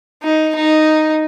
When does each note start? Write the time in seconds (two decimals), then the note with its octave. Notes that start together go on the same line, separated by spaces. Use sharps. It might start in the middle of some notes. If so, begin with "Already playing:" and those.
0.23 D#4
0.55 D#4